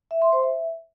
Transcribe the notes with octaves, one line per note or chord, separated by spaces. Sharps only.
E5
C6
C5
E5